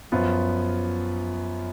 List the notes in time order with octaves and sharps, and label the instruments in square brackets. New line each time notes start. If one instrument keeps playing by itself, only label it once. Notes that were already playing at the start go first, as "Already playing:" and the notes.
[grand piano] F#2 F3 B3 F4